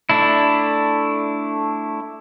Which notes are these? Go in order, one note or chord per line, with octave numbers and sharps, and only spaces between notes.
A3 D4 E4